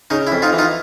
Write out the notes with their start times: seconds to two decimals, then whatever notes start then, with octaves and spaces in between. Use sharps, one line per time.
0.10 C#3 D#4
0.27 E4
0.32 F2
0.42 D#4 F4
0.53 E3
0.58 D#4 F4